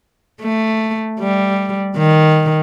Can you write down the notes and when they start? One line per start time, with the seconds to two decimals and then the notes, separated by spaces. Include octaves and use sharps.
0.41 A3
1.20 G3
1.97 D#3